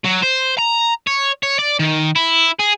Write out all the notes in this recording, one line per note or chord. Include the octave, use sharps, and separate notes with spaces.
F#3
C5
A#5
C#5
C#5
D5
D#3
E4
G#4